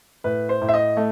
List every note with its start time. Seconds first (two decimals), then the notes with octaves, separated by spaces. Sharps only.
0.24 A2 B4
0.49 C5
0.62 A2
0.69 E5
0.74 D#5
0.97 A3